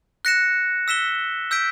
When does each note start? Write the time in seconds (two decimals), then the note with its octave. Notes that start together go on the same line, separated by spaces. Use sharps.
0.25 F#6 A#6 C#7 E7
0.88 E6 B6 E7 G7
1.51 E6 G6 B6 D7